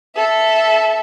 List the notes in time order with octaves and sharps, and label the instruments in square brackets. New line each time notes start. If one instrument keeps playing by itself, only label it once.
[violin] A4 E5